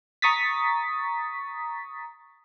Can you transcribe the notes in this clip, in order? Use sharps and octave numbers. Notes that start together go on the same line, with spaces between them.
A#5 C#6 D#6 A6 B6